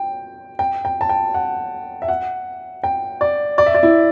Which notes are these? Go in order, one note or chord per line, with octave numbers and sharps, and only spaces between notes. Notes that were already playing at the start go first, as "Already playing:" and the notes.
Already playing: G5
G5
G5
A5
G5
F#5
E5
F#5
G5
D5
D5
E5
D5
E4